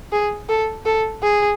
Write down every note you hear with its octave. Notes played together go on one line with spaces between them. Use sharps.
G#4
A4
A4
G#4